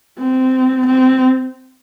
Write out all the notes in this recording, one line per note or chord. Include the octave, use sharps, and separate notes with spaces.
C4
C4